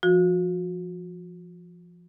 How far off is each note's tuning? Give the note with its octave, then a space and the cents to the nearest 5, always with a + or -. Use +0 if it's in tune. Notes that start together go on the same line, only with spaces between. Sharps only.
F3 -15 F#4 -35